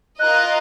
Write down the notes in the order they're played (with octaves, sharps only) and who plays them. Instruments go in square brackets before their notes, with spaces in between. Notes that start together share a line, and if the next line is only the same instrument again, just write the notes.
[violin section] F4 A#4 D#5 [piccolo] F#6